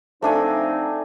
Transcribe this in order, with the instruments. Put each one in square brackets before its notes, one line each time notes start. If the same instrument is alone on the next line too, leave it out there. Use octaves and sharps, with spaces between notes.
[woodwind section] F3 C4 D#4 [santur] A3 D4 G#5